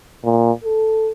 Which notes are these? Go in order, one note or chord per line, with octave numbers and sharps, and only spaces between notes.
A#2
A4